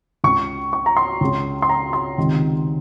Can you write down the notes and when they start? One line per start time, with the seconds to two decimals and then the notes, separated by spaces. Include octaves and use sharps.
0.24 C#2 C#3 C#6
0.73 C#6
0.86 A#5
0.97 C6
1.21 C#2 C#3
1.62 C6
1.69 A#5
1.93 C6
2.18 C#2 C3 D#3